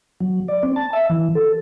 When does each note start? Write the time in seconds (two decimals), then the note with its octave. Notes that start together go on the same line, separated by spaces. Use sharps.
0.20 F#3
0.48 D5
0.63 C4
0.76 A5
0.93 E5
1.10 E3
1.35 A4